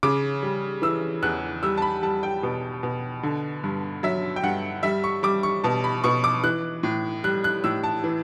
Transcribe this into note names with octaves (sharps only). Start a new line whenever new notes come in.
C#3 D6
G3
E3 E6
E2 F#6
G3 E6
A5
B5
G3 A5
G5
B2
B2
D3
G2
F#3 E5
G5
G2 F#5
G3 E5
C#6
G3 D6
C#6
B2 A5
B5
B2 C#6
D6
E3 F#6
A2
G3 F#6
F#6
A2 E6
A5
E3